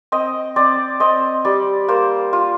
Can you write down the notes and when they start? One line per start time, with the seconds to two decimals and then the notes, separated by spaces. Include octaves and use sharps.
0.12 C4 D#5
0.56 C4 D5
1.00 C4 D#5
1.45 G3 D5
1.88 A#3 C5
2.33 F4